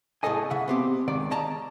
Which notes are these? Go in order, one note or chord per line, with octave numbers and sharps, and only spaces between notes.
A2 A#3 G#4 A4 D#5 G#5
C#3 E5 F#5
B3 C4 G4
C#2 D#3 D5
C#5 D#5 A5 A#5